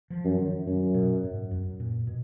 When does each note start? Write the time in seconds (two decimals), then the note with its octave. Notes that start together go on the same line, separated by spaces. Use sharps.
0.10 F3
0.24 F#2
0.39 D#3
0.67 F#2 F#3
0.94 B2
1.23 G#2
1.51 F#2
1.80 A#2
2.07 B2